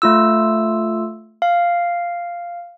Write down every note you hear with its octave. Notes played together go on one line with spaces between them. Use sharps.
A3 F4 E6
F5